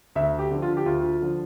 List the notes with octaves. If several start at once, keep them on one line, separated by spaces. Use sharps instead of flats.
D2 E5
G4
D3 F3
F4
G4
D2 F4
D3 F3